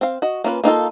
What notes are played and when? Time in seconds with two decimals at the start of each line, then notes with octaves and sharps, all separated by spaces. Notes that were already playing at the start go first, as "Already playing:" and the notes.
0.01 C4 F5
0.22 F#4 D#5
0.44 A#3 C#4 F4 B4
0.64 A#3 D#4 F4 A4